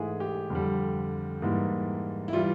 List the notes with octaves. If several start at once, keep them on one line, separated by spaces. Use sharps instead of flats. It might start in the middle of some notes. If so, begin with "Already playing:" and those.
Already playing: G#2 E3 A3 G#4
G4
F2 D3 G3
G#2 E3 G3 A#3
E4
E3 G3 F4